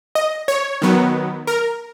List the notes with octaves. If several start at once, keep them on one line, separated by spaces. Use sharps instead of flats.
D#5
C#5
D#3 F#3 B3
A#4